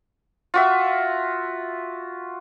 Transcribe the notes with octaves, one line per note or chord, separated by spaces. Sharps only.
F4 F#4 E5